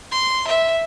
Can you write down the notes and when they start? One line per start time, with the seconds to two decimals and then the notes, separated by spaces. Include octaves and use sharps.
0.12 C6
0.47 E5